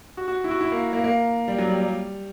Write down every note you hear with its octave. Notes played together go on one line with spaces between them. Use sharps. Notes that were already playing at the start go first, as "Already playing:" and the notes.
F#4
F#4
E4
F#4
E4
A#3
A#3
A#3
G3
F#3
G3
G3